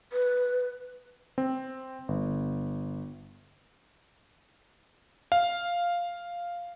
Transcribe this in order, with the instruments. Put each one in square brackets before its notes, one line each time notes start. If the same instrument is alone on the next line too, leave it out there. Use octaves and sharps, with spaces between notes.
[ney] B4
[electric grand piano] C4
G1
F5